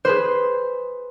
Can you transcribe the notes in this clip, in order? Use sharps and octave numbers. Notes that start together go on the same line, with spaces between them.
G#4 B4 C5